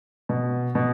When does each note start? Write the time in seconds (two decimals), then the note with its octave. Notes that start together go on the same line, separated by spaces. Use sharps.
0.29 B2
0.75 B2